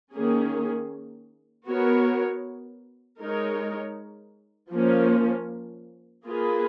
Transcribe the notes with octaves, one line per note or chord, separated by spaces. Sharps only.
D#3 A#3 C#4 G#4
B3 F#4 A#4 C#5
G#3 D#4 A#4 C#5
F3 A#3 C#4
A#3 F4 G#4 B4